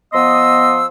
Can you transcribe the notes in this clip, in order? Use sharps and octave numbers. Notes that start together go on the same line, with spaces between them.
F3 B3 D#5 C6 D#6 E6